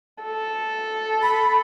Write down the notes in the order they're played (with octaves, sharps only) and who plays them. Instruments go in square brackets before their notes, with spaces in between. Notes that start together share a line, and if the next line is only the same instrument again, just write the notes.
[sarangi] A4
[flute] B5